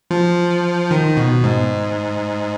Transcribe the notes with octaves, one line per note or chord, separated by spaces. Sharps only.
F3
D#3
B2
G#2